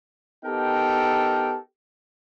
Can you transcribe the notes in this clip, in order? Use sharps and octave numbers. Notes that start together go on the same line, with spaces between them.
B3 D#4 G4 A4 A#4 G5